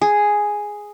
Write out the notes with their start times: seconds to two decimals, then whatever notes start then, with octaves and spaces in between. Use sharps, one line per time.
0.02 G#4